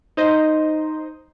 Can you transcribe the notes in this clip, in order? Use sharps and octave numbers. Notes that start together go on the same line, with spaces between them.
D#4 C5 D#5